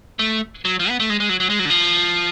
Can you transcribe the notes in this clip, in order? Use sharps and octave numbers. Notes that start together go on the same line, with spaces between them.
A3
F#3
F3
B3
A3
G#3
G#3
F#3
F#3
G#3
F#3
D3
F3